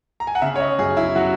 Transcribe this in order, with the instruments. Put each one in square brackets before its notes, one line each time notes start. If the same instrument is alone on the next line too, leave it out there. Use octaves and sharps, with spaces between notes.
[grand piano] A#5
G#5
F#5
C#3 E5
C#5
D#5
F#2 G#4
E4
F#3 F#4